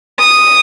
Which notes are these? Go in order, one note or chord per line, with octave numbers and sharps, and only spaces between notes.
D#6